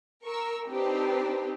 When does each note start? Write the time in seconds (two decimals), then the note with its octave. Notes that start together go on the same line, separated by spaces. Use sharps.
0.23 A#4 C#6 E6
0.68 C4 D4 D#4 G4 B4 C5